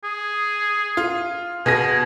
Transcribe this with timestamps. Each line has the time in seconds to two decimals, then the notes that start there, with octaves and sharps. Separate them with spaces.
0.04 G#4
0.97 F4
1.66 B2 G#4 G#5 A#6